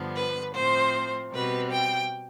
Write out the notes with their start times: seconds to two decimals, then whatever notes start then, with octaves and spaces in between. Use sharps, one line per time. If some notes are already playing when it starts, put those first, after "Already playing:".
Already playing: G2 D3 F3 B3
0.15 B4
0.54 A2 F3 C4 C5
1.31 B2 G3 C4 B4
1.71 G5